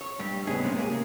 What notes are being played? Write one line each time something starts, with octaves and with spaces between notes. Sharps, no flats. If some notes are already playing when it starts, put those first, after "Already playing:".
C#5
G2 G3
D#2 A2 C#3 B3 D#4 G#4
C3 G#3 C#4
A2 C#3 A#3 G#4